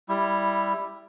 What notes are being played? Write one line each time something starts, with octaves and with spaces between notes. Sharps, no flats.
G3 E4